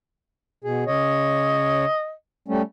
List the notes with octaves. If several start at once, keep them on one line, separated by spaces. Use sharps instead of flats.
B2 G#4
C#3 C#5 D#5
G3 A3 C#4